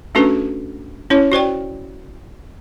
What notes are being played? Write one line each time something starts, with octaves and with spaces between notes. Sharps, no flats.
A3 C#4 D4 F#4 A4 B4
C#4 E4 C#5
F#4 C5 D5 G5